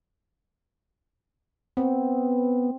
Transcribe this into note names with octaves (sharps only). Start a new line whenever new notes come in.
B3 C4